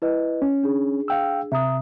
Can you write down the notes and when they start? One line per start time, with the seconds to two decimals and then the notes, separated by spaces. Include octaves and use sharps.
0.02 E4 B4 D#5
0.42 C#4
0.63 D4 G#4
1.08 F5 G5 E6
1.52 C3 E5 A#5 D#6